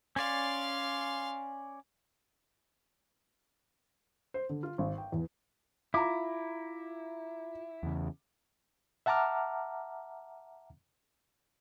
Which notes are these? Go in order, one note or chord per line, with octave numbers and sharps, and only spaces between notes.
C#4 D5 F5 C6
C5
D3
F4
G#1
G5
E2
E4 F4 A#5 D6
E2 C#3
E5 F#5 A5 A#5 D6 F6